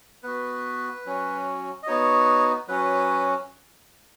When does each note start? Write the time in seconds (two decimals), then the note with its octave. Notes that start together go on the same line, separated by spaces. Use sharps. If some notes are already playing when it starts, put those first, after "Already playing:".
0.23 B3 F#4 B4
1.06 F#3 C#4 F#4
1.83 D#5
1.87 B3 D#4 F#4 C#5
2.68 F#3 C#4 F#4 B4